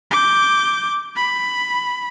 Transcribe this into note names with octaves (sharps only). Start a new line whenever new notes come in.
D6 G6
B5